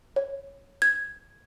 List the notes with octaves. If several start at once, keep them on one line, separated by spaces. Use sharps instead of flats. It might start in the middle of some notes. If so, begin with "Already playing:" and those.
C#5
G#6